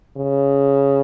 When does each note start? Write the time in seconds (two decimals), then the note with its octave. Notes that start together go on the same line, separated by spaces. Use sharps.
0.17 C#3